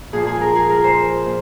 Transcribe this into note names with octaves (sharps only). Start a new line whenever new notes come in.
A#2 F3 G#4
G#4
A#4
G#4
A#4
C5
A#2